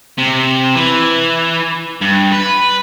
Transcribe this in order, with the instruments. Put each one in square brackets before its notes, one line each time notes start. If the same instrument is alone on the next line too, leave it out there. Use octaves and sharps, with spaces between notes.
[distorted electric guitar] C3
E3
G2
B4